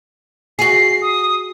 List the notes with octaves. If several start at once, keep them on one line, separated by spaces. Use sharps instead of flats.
F#4 G#4 C7
D#6